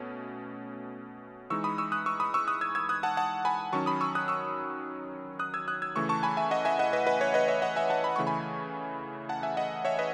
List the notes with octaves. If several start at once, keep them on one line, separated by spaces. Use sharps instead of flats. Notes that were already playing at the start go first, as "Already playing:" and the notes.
Already playing: B2 A3 C#4
E3 G#3 D#4 C#6 E6
B5 D#6
C#6 E6
D#6 F#6
C#6 E6
B5 D#6
C#6 E6
D#6 F#6
E6 G#6
E6 G#6
D#6 F#6
F#5 A5
F#5 A5
G#5 B5
D#3 F#3 C#4 A5 C#6
B5 D#6
C#6 E6
D#6 F#6
C#6 E6
D#6 F#6
E6 G#6
D#6 F#6
E6 G#6
C#3 E3 A3 C#6 E6
A5 C#6
G#5 B5
E5 G#5
D#5 F#5
E5 G#5
D#5 F#5
B4 D#5
B4 D#5
C#5
B4 D#5
C#5 E5
D#5 F#5
E5 G#5
F#5 A5
B5
C#3 E3 A3 C#6
G#5 B5
F#5 A5
E5 G#5
D#5 F#5
C#5 E5
B4 D#5